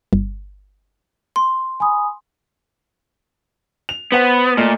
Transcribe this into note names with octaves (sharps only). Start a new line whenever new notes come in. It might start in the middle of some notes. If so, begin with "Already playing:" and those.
G1
C6
G#5 B5 D#6
F7
B3 C5 F#5
A#2 A3 D#5 F6